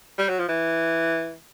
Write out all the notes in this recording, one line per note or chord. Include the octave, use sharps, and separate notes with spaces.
G3
F#3
F3
E3